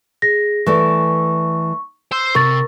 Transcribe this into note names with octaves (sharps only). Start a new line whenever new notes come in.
G#4 A#6
E3 A3 D5 C#6
C5 C6 E6
C3 A#4 C#6 A6